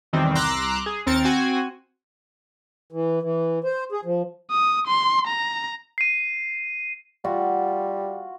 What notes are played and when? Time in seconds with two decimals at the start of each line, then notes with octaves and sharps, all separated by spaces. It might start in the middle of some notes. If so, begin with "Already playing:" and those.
0.13 E2 B2 D#3 G3 C4
0.35 C2 A#5 C6 D6 E6 F#6
0.86 G#4
1.06 D#2 C4 A#4 A6 C#7
1.24 C4 F#4 G#5
2.92 E3
3.22 E3
3.64 C5
3.92 G#4
4.05 F3
4.51 D#6
4.87 C6
5.27 A#5
5.98 C7 D#7
7.24 G3 F4 F#4